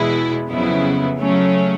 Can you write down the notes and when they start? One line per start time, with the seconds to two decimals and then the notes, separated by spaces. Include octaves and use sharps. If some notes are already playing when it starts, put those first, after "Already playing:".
Already playing: E2 B2 G#3 B3 E4
0.48 F2 C#3 F#3 B3 E4
1.20 C#3 F#3 A3 C#4